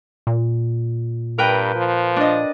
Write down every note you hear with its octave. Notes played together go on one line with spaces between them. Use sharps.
A#2
G2 A#4 B4 G5
F3
D4 D#5